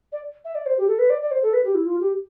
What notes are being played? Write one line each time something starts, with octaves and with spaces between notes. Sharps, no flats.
D5
E5
D5
C5
G4
A4
B4
D5
D5
C5
A4
B4
G4
E4
F4
G4